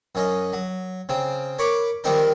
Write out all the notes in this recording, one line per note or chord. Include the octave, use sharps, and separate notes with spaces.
F#2 C#4 D#5
F#3
C#3 C4
A#4 C#5 B5 C#6 D6
D#3 F3 G3 C4 D#4 A#4